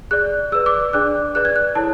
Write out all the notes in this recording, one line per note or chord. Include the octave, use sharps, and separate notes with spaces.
G#4 D5 F#6
G#4 B4 D5 E6
D6
D4 G#4 D5 F#6
G#4 B4 D5 F#6
G#6
F#6
E4 A4 C#5 A5